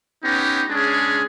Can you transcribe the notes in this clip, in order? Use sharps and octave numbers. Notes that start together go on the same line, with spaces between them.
B3 C#4 D#4 G4
G#3 C#4 D4 G#4